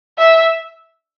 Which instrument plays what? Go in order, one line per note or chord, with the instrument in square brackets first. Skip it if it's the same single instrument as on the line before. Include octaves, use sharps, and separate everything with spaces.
[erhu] E5